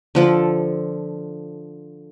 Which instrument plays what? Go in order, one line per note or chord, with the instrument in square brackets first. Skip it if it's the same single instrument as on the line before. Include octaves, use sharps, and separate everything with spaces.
[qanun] D3 F3 A4